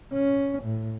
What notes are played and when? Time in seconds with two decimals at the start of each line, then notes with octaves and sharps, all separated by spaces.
0.13 C#4
0.63 A2